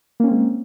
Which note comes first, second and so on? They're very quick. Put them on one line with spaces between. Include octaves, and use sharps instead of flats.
A#3 C#4 C4 G#3